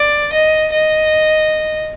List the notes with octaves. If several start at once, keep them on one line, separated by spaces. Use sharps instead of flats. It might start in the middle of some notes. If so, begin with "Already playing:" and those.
Already playing: D5
D#5
D#5